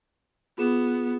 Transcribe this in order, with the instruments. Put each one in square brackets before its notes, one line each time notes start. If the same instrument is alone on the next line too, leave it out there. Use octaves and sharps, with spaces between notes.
[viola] B3 [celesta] F4 G#4 E7